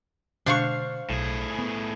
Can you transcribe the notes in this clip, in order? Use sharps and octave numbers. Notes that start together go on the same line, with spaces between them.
B2 D3 G#3 D4 C5 F5 F#5 C#6
B1 A2 G#4
B3